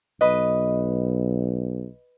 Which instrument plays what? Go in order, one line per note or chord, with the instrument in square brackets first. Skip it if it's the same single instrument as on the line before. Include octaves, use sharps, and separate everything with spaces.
[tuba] B1 [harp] B4 D#5